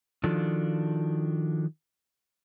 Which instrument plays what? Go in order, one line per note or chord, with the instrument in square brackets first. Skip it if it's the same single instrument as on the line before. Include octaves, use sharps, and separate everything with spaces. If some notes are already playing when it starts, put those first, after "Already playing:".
[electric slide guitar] D#3 F3 D4 F4 F#4 A4